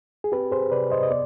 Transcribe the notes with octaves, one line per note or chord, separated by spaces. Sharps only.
G#4
C4 G4 B4
G#4 C5
C3 B4 D5
C5 D#5
D#5
B3 D5